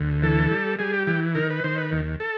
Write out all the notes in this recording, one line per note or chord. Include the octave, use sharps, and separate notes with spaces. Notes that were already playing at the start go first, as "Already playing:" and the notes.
Already playing: D2
E3 A4
G3
G3 G#4
G4
E3 G4
D#3 A#4
B4
D#3 C5
B4
D#2
A4